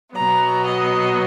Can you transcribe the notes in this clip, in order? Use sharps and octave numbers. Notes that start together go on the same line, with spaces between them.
B2 F#3 B3 A#5
D#5